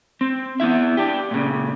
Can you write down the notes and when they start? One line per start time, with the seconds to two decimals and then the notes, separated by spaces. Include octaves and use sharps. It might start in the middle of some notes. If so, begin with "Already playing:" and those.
0.21 C4
0.60 B3 C4 E4 E5
0.97 D4 G4
1.31 A#2 C#3